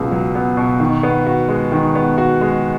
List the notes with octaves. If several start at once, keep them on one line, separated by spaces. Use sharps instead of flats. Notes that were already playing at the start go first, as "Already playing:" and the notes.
Already playing: C#2 B2 F#3 B3
F#3
B3
B2
D#3
B3
F#4
G#3
D#3
B3
F#4
G#3